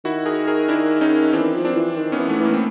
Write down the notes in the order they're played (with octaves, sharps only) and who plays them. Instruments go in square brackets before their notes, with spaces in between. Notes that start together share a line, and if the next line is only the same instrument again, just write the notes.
[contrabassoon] D#3 [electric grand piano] E4 F#4
[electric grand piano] G#4 A#4
G#4 A#4
D4 E4
C#4 D#4
[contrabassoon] E3 [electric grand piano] C4 D4
[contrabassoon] F3
[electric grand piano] C4 D4
[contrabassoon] E3
D#3
[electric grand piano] B3 C#4
[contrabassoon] E3
[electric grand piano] A3 B3
[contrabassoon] E3
[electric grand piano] A#3
C4